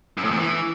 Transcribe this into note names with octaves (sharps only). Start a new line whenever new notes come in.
F#2
A2
E2
E3